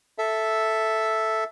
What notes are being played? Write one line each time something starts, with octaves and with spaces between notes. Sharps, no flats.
A4 E5